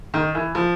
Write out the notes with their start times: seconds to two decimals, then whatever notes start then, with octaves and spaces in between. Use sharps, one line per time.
0.14 D#3
0.35 E3
0.55 F3